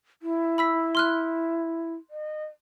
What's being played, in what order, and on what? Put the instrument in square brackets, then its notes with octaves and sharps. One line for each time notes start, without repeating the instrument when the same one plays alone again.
[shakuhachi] E4
[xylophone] B5 E6 B6
C6 F6 F#6
[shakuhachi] D#5